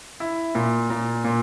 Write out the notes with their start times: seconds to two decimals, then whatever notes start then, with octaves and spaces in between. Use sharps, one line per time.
0.20 E4
0.55 A#2
0.90 A#2
1.24 A#2